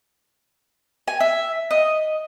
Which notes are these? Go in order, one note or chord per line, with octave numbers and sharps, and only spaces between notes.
G#5
E5
D#5